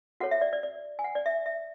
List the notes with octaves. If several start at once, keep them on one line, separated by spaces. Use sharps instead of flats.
F#4 A4 C#5 F#5
E5
D5
D5
D5
G#5
F#5
D5
E5
E5